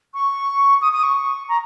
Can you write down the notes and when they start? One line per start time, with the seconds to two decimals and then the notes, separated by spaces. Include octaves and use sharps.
0.14 C#6
0.82 D#6
0.93 D#6
1.03 C#6
1.49 A#5